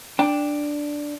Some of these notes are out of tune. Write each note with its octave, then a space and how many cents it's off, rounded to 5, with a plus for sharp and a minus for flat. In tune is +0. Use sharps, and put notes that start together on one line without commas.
D4 +0 G5 +15